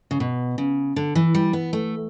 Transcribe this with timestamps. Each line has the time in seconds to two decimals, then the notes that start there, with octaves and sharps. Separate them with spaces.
0.11 C#3
0.20 B2
0.58 C#3
0.96 D3
1.15 E3
1.35 G3
1.53 B3
1.73 A3